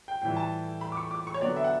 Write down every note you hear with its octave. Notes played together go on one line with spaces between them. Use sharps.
G5
A2 E3 G3 G5
A5
B5
D6
C#6
D6
C#6
C#5
D3 F#3 B3 D4 D5
E5
F#5